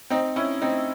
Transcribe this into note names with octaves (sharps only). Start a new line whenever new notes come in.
C4 D#4
C#4 E4
C4 D#4